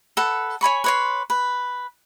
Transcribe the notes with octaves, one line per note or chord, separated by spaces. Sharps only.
A4 B4 F#5
C#5 G#5 B5 C#6
B4 C#5 C6
B4